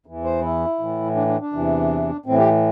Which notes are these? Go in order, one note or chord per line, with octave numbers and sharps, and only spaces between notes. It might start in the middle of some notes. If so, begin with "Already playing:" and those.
E2 E3
C5
E4
A2 E3
D4
D4
D4
E2 C3 E3
A2 E3 C4
G4